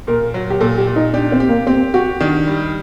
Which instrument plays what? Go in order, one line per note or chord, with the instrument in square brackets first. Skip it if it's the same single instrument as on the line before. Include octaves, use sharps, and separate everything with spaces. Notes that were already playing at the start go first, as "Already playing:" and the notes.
[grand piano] A#2 [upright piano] A#4
[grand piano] F#3
[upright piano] G4
[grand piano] A#2 [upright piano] A4
[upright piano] G4
[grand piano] A#2
[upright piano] D#4
[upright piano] D4 [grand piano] G4
[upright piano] C4
[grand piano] G4
[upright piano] A#3
[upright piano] C4 [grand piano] G4
[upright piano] F#4 [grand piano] G4
[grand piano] D#3 [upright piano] D4
[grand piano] G3